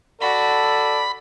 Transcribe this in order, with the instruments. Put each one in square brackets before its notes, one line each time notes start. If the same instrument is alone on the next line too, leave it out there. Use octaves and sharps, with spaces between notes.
[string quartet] F#4 [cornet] A4 [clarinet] D5 [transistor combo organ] B5